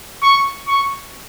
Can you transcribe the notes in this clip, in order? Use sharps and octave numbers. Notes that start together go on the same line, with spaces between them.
C#6
C#6